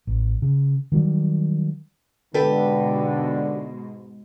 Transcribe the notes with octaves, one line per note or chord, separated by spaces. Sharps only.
A1
C#3
D#3 F#3 G3
G#2 B2 D3 G4 A4 B4